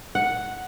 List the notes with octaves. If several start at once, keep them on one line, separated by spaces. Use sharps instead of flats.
F#5